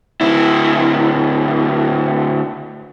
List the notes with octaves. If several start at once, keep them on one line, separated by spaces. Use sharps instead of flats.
D2 E4